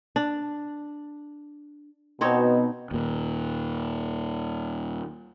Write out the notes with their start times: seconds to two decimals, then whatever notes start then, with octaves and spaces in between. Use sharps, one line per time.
0.16 D4
2.21 B2 C4 D#4 C#5
2.91 D#2 A#2